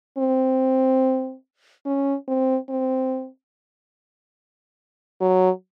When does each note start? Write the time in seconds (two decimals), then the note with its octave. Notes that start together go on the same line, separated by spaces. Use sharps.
0.18 C4
1.86 C#4
2.28 C4
2.69 C4
5.21 F#3